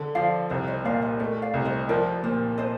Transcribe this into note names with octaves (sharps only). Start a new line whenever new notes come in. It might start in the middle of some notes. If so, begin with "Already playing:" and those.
Already playing: D3
F3 D5 F5
C2 C5 D#5
C5 D#5
A#2 D5 F5
C5 D#5
A3 A#4 D5
D5 F5
C2
C5 D#5
F3 A#4 D5
A#2 C5
C5 D#5